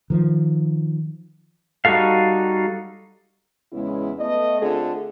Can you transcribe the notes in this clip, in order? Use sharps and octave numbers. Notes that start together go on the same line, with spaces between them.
D#3 F3
G3 D#4 F#4 A4 F5
E2 C#3 G#3 B3 C#4 E4
A3 B3 D#5
D3 A3 C4 F4 G#4